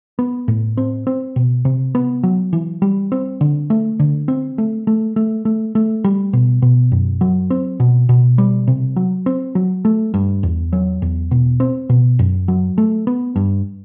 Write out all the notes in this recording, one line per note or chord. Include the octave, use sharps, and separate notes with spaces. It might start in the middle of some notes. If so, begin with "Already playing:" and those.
B3
A2
C4
C4
B2
C3
B3
F#3
E3
G3
C4
D3
A3
D3
C4
A3
A3
A3
A3
A3
G3
B2
B2
F#2
F#3
C4
B2
B2
G3
C3
F#3
C4
F#3
A3
G2
E2
F#3
E2
B2
C4
B2
F#2
F#3
A3
B3
G2